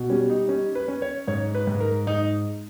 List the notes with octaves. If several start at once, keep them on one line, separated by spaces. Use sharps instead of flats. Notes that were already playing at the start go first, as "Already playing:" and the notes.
Already playing: B2
G3 C#4
D#4
C#4 D#4
B4
C#4
C#5
G#2 C#5
B4
G#2
A#4
G#2 D#4